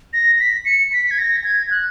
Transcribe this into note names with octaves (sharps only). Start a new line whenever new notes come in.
A#6
B6
C#7
B6
G#6
A#6
G#6
F#6